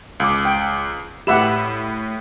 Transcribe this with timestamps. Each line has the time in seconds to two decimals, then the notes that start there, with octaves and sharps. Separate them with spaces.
0.20 C#2 D6
0.45 G5
1.27 A2 G4 E5 F#5 B5 E7